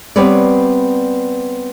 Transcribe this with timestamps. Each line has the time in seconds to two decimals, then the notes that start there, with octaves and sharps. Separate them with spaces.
0.16 G3 B3 C4 B4 C#5 D5